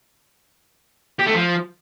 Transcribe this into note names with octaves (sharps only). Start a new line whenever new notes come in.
G4
A3
F3